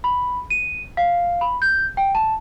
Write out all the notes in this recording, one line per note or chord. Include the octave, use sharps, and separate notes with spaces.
B5
D#7
F5
B5
G6
G5
A5